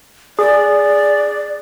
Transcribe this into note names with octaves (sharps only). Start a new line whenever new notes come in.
G#4 D5